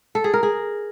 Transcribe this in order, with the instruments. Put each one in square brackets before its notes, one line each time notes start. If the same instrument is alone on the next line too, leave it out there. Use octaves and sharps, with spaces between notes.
[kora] A4
G#4
A#4
G#4